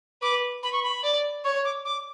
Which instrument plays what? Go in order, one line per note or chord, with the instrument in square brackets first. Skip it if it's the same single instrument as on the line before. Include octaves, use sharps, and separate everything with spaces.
[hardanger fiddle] B4 [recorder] D6
[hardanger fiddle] B4 [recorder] B5
[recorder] C#6
B5
[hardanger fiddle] D5
[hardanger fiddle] C#5 [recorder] C#6
[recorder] D6
D6